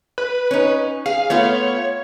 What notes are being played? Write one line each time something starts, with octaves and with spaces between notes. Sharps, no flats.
B4
C#4 D#4
G#4 F5
A3 B3 F4 C#5